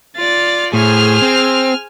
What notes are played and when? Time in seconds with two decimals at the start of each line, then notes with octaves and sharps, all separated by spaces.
0.17 F4 D5 A6
0.74 A2 G#4 C5 G#5 F6
1.22 C4